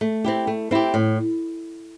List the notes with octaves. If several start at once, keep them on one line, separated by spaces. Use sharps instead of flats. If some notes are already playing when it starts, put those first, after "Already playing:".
A3
C4 E4 G4
A3
C4 E4 G4
A2